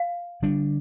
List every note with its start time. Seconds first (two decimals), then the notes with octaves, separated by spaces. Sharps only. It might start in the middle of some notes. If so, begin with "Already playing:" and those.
Already playing: F5
0.42 D3 G3 D4